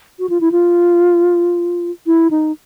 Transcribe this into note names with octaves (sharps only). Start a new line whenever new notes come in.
F#4
F4
E4
F4
E4
D#4